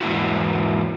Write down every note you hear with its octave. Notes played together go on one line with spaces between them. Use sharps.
E2 G#2 A#3 E4 F#4